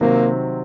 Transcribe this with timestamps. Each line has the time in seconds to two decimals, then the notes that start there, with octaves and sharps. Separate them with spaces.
0.01 C3 D#3 F#3 A#3 C4